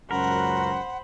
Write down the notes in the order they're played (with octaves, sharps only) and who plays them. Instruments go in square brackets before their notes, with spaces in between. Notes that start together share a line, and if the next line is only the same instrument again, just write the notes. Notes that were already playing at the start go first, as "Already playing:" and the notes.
[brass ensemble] C#2 F#2 F#4 [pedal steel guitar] A#4 [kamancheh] C5 B5 [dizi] F#5